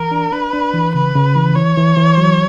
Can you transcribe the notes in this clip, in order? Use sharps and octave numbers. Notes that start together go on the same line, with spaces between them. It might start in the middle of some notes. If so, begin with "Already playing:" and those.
Already playing: E3 A#4
D4
D4 B4
D4
E3
C#3 B4
C#3
E3
E3 C#5
E3
E3
F#3